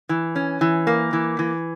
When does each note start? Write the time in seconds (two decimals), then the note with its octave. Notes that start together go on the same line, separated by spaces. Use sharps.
0.09 E3
0.36 C#4
0.61 E3
0.87 A#3
1.13 E3
1.39 E3